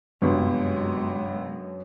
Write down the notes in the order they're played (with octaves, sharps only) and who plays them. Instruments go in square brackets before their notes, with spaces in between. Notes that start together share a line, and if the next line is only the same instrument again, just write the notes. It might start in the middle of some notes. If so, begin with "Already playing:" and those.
[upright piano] G1 C3 [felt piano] F#2 B3 [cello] G#3